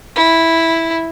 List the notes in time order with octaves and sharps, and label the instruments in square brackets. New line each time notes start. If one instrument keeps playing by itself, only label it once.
[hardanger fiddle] E4